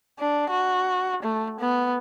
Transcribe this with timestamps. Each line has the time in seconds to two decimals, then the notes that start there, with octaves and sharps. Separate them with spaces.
0.19 D4
0.50 F#4
1.23 A3
1.60 B3